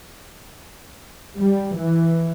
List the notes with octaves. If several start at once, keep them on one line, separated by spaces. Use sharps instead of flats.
G3
E3